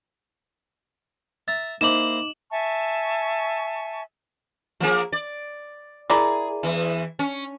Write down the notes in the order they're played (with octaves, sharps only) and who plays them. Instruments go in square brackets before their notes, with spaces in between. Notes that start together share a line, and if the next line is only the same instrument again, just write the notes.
[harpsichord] E5 A#5 [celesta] A6
[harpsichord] A#3 E4 C5 [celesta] D#4 D#5 D6 [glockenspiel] E7 F#7
[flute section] E5 G#5 A5 C#6
[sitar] F3 A#3 G#4
D5
[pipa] E4 A#4 D5 [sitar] G#4
[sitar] E2 E3
C#4